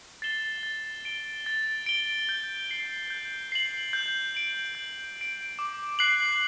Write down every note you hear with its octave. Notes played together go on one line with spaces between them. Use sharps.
A6 C7 E7 G7
A6
D7 G7
A6
D7 G7
G6
C7 F#7
G6
C7 F#7
G6
D7 F#7
G6
D7 F#7
D6
F#6 C7 F#7